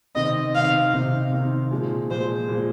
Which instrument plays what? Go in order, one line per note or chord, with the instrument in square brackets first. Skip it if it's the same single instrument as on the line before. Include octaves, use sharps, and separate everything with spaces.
[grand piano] C3 D#3 C4 D#4 [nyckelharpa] D#5
[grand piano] C3 D#3 C4 D#4 [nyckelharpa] F5
[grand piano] C3 D#3 C4 D#4
C3 D#3 C4 D#4
A#2 F3 G#3
[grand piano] A#2 F3 G#3 [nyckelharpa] C5
[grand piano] A#2 F3 G#3